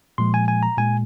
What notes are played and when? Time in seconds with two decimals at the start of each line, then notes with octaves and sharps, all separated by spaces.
0.18 A#2 F3 G#3 C6
0.34 G#5
0.48 G#5
0.63 A#5
0.78 A#2 G#3 G#5